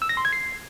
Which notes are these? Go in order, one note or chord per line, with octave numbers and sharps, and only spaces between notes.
E6
A#6
C6
G#6
C7